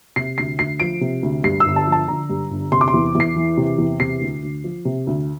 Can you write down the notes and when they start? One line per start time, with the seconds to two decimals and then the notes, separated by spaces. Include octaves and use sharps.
0.16 C3 C7
0.38 D2 C7
0.59 D2 C7
0.80 F3 D7
1.01 C3
1.23 D2
1.44 G2 C7
1.60 E6
1.66 G1
1.76 A5
1.87 F3
1.92 A5
2.08 D3 A#5
2.29 G2
2.51 G1
2.72 C3 C6
2.81 D6
2.88 C6
2.94 E2
3.15 E2
3.20 C7
3.36 E3
3.57 C3
3.78 E2
4.00 C3 C7
4.21 D2
4.43 D2
4.64 F3
4.85 C3
5.07 D2